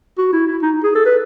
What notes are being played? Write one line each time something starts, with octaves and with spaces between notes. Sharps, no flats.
F#4
E4
E4
D#4
G#4
A4
B4